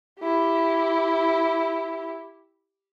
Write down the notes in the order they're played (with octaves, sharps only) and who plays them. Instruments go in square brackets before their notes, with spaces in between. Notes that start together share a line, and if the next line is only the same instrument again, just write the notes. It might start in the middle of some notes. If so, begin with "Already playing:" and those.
[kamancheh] E4 G4